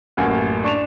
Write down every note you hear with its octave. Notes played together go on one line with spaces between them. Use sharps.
A1 F#2 A2 A#3 F#4
D4 C#6 E7 F7